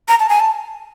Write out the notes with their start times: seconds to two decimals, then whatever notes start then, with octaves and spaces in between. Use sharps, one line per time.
0.08 A#5
0.20 A5
0.29 G#5
0.40 A5